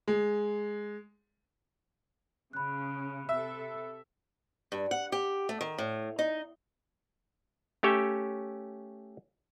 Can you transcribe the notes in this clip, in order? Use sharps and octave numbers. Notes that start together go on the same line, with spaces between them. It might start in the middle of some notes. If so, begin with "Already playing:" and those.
G#3
C#3 B5 F#6
C3 A4 E5
G2
F#5
G4
A3
D#3
A2
D#4
A3 C#4 G4 C#5 E5 G5